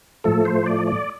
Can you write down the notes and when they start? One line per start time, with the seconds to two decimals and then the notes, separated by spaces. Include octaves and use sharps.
0.24 A2 F3 A3 A4
0.45 C5
0.66 D5
0.87 D5